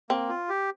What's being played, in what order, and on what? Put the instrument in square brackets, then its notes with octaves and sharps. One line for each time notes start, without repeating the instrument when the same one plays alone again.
[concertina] A#3 [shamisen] C4
[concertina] F4
G4